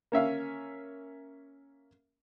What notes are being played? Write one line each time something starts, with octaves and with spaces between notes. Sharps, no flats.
A#3 C#4 E5 F5